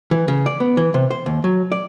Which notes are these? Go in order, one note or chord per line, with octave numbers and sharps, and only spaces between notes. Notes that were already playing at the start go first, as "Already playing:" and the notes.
E3
C#3
D5
B3
E3
C3
C5
D#2
F#3
D5